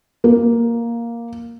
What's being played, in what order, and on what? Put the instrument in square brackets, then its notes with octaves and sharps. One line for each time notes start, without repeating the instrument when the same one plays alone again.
[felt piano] A#3